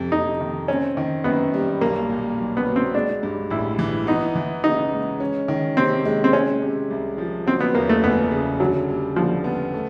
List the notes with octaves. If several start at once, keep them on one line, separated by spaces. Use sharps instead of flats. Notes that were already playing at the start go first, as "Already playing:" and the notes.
Already playing: F2 C3
F2 D#4
D#3
C4 C#4
D#3
F#2 B3
G3
B1 A#3
A#2
B1
B3
F#3
C4
G#3 D4
G2
A1 E4
E3
B3 D#4
E3
C#3 D#4
G#3
C#4
D#3
C3 C4
G#3
C4
G#3 C#4
C3
C2
F3
F#3 C4
B3
E2 A#3
A3
F#1 B3
C#3
D3 F#3
G3
D3 F3
B3
A3